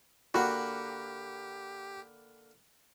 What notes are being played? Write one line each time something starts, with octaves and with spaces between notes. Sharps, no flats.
D3 A#3 F#4 G4 G5 B5